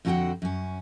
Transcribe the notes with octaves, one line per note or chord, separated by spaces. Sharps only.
F2 D3 F#4 A4 F#5 G5
F#2 C#4